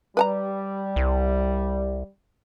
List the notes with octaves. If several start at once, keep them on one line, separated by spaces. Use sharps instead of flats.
G3 B4 G#5 A#5
C2